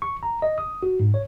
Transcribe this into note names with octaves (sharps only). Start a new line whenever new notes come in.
C#6
A#5
D#5
D#6
F#4
G#2
C#5